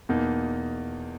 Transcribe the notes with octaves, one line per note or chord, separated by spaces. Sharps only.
E2 B2 A#3 D#4